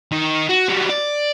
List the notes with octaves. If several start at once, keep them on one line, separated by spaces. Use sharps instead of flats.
D#3
F#4
F#3 G3
D5